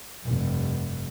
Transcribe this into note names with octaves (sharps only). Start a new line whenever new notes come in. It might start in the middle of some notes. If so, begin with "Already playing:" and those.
F1 G2